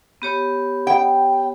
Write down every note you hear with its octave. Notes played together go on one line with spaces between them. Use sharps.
B3 G4 C#5
G5